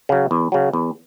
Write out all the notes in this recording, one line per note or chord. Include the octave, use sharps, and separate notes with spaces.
C#3 F#3
E2
C#3 F#3
E2